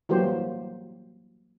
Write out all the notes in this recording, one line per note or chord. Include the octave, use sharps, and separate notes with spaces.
E3 F#3 G3 A#3 G4 C5